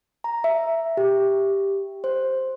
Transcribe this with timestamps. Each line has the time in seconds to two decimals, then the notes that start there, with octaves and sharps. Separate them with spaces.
0.24 A#5
0.44 E5
0.97 G4
2.04 C5